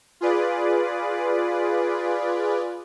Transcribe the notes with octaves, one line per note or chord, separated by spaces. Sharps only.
F4 G#4 B4 D5